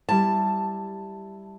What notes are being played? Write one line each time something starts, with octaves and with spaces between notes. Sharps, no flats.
G3 E4 A5